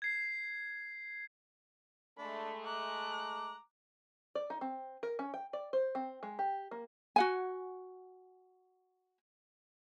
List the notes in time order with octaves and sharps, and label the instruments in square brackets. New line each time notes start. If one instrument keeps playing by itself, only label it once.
[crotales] G#6 C7
[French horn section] G#3 A3 [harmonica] D4 [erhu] B5
[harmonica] A#5 D6 [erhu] F#6
[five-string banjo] D5
D#4
C4
A#4
C#4
G5
D5
C5
C4
G#3
G4
A#3
[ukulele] F#4 F#5 G#5